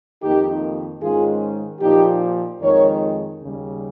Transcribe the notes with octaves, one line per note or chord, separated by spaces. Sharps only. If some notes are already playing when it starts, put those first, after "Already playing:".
F2 D#3 A#3 D#4 G4
G#2 D#3 G#3 C#4 F4 G#4
A#2 F3 A#3 D#4 G4
F2 D#3 G#3 A#4 C#5
D#2 C#3 G3